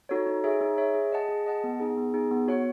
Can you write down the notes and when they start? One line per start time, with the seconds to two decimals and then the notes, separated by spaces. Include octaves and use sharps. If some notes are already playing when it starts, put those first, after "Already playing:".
0.09 D#4 F#4 A4 C#5
0.26 D#4
0.44 G#4 C#5 E5
0.61 D#4
0.77 G#4 C#5 E5
0.95 G#4
1.12 D#5 F#5 A5
1.28 G#4
1.46 D#5 F#5 A5
1.64 B3
1.80 D#4 G#4
1.97 B3
2.14 D#4 G#4
2.31 B3
2.48 F#4 C#5 F#5